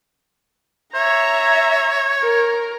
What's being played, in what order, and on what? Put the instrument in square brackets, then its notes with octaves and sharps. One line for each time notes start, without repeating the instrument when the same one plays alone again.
[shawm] C#5 [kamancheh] E5 A#5
[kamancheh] A#4